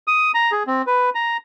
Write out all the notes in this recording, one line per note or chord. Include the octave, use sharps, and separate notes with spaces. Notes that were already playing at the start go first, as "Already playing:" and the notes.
D#6
A#5
G#4
C4
B4
A#5